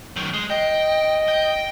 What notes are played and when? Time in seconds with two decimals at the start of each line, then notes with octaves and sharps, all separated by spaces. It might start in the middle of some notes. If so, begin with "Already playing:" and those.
0.16 F#2 D#3
0.34 G#3
0.50 D#5 G5
1.28 G5